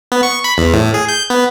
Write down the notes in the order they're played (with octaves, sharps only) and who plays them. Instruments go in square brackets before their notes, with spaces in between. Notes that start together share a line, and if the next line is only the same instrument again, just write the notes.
[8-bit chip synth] B3
C#6
B5
E2
A2
G#4
G6
B3